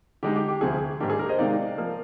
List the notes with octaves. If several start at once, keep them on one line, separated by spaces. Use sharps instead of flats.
D3 G#3 D#4 G4
G4
G4
D2 C3 F3 G#4
G#2 D#3 A#3 D4 G4
G#4
G4 A#4
C5 D#5
C3 D#3 G#3 D#4 D5 F5
F3 A#3